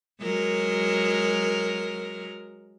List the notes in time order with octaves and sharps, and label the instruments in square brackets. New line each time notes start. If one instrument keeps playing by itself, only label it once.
[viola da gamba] F#3 G#3 A#4